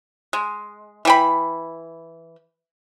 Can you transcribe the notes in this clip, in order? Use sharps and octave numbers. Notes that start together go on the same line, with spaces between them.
G#3
E3 G5 B5